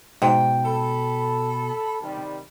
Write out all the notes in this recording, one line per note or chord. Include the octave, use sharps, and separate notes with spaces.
G#2 B2 G5
A4 B5
C3 D#3 G3